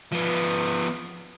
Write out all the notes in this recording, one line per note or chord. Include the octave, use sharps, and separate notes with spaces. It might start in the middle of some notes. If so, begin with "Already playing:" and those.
F3 B3